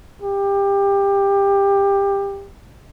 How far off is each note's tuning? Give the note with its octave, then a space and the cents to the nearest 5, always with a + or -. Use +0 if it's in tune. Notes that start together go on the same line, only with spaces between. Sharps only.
G4 +20